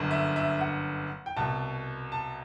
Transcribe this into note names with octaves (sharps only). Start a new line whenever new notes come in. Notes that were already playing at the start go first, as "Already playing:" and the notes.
Already playing: G1 F#2 D3
E5
E5
F#5
G5
C2 B2 A5
A5